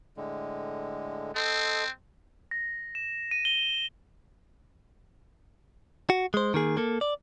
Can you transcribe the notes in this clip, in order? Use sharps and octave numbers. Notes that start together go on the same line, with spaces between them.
A2 D3 G#3
C4 A4 D#5 C6
A#6
E7
D#7
G7
F#4
G#3 C5
D#3 A#3 G#4
A#3 A4
D5